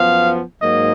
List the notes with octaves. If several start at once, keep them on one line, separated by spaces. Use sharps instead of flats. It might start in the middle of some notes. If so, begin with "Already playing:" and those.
Already playing: F#2 F3 B3 F5
G#2 F#3 A#3 D#5